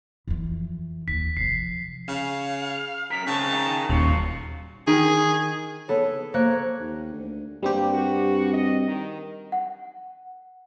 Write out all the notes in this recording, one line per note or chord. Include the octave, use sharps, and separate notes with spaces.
F2 E3
D#2 B6
C3 F3 C7
C#3 F5
F#2 A#4 B6
C#3 G#3 C4 A5
D#3 D#4
D#1 F#3 F4 C#6
D#3 G#4
B3 A4 C#5
A#3 C5 C#5 F#6
D#2
D2
G2 G3 A#3 C4 G4
F#4
D#5
D#3
F#5